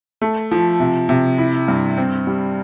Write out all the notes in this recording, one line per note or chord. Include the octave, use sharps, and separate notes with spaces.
A3
F3
C3
C3
E4
G2
C4
G3